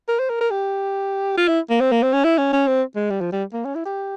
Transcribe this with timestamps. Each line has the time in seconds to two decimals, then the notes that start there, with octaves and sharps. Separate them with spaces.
0.08 A#4
0.19 C5
0.29 A#4
0.41 A#4
0.51 G4
1.37 F4
1.48 E4
1.70 A#3
1.81 C4
1.92 A#3
2.03 C4
2.13 C#4
2.24 E4
2.38 C#4
2.53 C#4
2.67 C4
2.95 G#3
3.10 G3
3.21 F3
3.32 G3
3.53 A#3
3.65 C#4
3.75 E4
3.85 G4